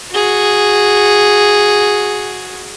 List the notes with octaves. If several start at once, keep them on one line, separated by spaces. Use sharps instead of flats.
F#4 G#4